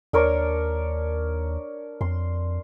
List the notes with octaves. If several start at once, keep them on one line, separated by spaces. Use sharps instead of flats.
D#2 D4 A#4 C#5
F2 C6